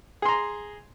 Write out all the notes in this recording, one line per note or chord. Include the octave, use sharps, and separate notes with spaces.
G#4 A#5 C6